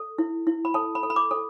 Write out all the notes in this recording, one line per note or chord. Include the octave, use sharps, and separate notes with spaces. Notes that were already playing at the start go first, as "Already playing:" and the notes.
Already playing: A4
E4
E4
B5
A4 A5
B5
A4
B5
D6
A4